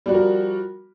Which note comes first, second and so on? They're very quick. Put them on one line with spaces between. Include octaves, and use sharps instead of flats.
G3 F#4 F3 A#4